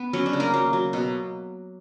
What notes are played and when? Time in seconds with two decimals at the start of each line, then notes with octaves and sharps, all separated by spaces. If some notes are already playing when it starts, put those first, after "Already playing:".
Already playing: B3
0.13 F#3 C#4
0.26 D4
0.33 C#3
0.40 A#3 A#4
0.54 F#3
0.73 F#3
0.93 B2